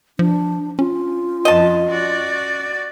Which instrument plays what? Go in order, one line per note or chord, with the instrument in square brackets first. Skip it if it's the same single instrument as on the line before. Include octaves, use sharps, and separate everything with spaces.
[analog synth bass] F3 [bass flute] D4
[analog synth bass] C#4 [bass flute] F4
[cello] F2 F3 [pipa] D#5 A5
[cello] F#4 D5